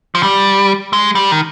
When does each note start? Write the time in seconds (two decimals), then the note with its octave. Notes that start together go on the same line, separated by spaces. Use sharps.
0.15 F3
0.23 G3
0.93 G#3
1.15 G3
1.32 D#3